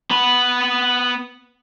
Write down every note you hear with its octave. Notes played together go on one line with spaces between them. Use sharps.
B3 B5